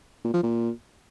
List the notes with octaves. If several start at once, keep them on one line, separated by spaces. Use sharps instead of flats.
A#2
F3
A#2